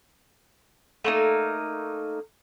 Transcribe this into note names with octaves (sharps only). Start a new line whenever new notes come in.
A3 A#3 D#4